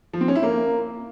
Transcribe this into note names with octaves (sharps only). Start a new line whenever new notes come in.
F3
C4
C#4
E4
A#3